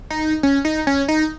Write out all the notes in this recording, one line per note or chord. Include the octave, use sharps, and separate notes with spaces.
D#4
C#4
D#4
C#4
D#4